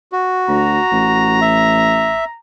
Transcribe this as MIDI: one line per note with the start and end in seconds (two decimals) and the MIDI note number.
0.12 1.40 66
0.48 0.79 38
0.48 2.37 82
0.91 2.22 33
1.41 2.25 76